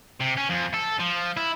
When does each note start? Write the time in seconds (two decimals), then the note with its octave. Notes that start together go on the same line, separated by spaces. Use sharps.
0.21 C3
0.38 C#4
0.50 F2
0.74 A4
0.99 F3
1.37 E4